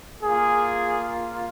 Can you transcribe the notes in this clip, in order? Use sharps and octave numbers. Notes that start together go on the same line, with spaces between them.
A#3 F4 G#4